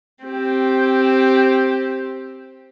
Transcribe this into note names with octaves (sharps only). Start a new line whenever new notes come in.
C4 G4